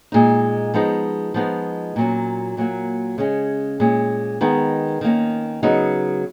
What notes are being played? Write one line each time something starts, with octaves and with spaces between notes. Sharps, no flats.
A#2 G#3 D#4
F3 G#3 B3 D#4
F3 G#3 B3 D#4
A#2 F#3 C#4
A#2 F#3 A#3
C#3 G#3 C#4
A#2 G#3 C#4
D#3 G#3 B3 D#4
D#3 A#3 C#4
C#3 F#3 B3 D#4